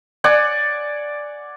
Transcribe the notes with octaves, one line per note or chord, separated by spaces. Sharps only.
D5 F#5 G#5